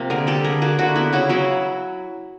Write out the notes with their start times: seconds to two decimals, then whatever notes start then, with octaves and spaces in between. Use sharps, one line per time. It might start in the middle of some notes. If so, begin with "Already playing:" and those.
Already playing: C3 F3 A#3
0.10 D3 G#4 A#4
0.27 G3 G4 A4
0.44 D3 G#4 A#4
0.62 A#3 F#4 G#4
0.79 D3 E4 F#4
0.96 B3 E4 F#4
1.13 C#3 E4 F#4
1.29 F#3 E4 F#4